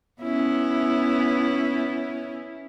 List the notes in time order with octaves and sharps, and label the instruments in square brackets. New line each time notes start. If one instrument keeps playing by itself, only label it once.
[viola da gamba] B3 C#4 E4